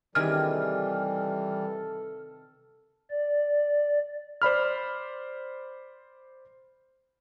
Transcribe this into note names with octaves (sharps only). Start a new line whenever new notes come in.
C3 D#3 E3 G3 G#4 A4 F6
D5
C5 D5 B5 F6